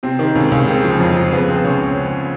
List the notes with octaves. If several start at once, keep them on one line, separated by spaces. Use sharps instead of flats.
C3 C4
D#3
C#2 C#4
C#2
C#3 C4
F3
F2
F2
C#3 B3
F3 C4
C#2 C#4